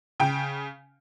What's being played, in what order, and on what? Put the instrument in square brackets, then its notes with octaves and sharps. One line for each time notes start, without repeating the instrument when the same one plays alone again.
[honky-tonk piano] C#3 G5